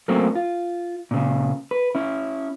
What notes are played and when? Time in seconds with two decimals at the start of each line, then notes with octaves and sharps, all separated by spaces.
0.08 F#3 A3 A#3 C4 C#4
0.35 F4
1.11 A#2 C#3
1.71 B4
1.95 C#4 E4